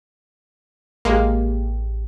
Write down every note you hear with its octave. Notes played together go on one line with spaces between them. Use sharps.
A1 G#3 A#3 G4